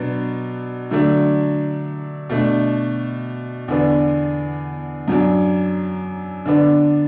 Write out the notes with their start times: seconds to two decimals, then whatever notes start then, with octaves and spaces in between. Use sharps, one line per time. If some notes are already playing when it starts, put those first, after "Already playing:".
Already playing: B2 F#3 B3 D4
0.91 D3 F#3 A3 D4
2.30 B2 A3 D4
3.68 E2 D3 B3 D4
5.08 F#2 F#3 D4
6.46 D3 B3 D4